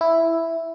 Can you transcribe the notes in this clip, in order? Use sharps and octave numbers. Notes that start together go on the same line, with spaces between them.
E4